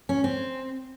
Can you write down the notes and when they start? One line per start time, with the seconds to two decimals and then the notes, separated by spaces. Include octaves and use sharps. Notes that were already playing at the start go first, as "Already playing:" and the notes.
0.09 C#4
0.24 C4